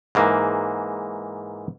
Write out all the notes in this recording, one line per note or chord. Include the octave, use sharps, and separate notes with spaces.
G#2 E3 A#3